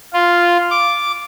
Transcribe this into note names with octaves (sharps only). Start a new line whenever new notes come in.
F4
D6